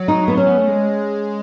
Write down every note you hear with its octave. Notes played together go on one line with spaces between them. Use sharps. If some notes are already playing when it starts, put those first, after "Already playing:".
Already playing: F#3
D#4
B3
C#4
B3
A3
G#3